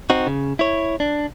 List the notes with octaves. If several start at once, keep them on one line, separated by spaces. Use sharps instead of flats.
C4 D#4 F#4
C#3
E4 C#5
D4